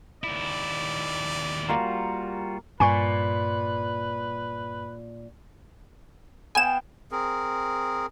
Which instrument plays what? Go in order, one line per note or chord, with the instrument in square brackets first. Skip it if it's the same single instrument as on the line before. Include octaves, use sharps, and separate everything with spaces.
[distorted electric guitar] D#2 E4 [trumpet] D5
[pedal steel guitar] G3 F4 F#4 [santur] A#3 F5
[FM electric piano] G2 [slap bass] A#2 [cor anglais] B4 [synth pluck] G#5 C#6 C#7
[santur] B3 F5 G5 [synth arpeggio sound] G#5 E7
[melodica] C4 G#4 A#4